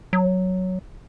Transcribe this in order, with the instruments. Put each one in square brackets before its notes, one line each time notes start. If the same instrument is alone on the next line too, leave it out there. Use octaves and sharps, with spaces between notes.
[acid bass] F#3